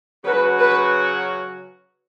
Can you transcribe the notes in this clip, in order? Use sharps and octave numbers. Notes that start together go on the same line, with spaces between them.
C#3 F#3 C#4 F#4 B4
B4